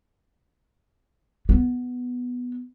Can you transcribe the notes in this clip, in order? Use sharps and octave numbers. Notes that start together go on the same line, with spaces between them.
B3